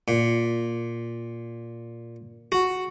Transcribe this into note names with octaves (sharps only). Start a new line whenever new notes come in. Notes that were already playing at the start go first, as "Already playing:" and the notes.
A#2
F#4